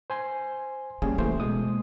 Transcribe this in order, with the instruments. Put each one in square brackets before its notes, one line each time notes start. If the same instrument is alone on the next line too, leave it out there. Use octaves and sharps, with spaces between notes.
[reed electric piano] C5 G#5 C6
[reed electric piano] G3 C#4 G#4 [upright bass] A#3
[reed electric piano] E3 A3 C5 [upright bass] A#3
[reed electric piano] B2 G#3 D#6